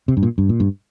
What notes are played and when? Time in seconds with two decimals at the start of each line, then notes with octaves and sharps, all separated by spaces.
0.08 C3
0.17 G2
0.23 A#2
0.38 G2
0.49 A#2
0.60 G2